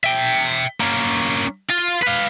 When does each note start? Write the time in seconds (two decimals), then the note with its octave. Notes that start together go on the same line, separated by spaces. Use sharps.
0.04 E5 G5
0.80 A#3 C#4
1.70 F4
2.02 B4 F5